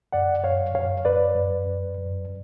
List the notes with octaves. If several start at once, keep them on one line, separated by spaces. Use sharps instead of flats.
F#2 D5 F#5
F#2 C#5 F5
F#2 C#5 F5
F#2 B4 D5
F#2
F#2
F#2